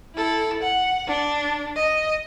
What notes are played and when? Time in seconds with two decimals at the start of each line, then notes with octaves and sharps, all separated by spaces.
0.15 E4 A4
0.63 F#5
1.08 D4
1.77 D#5